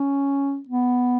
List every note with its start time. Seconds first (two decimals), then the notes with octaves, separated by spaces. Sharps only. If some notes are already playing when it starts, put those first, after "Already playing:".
Already playing: C#4
0.68 B3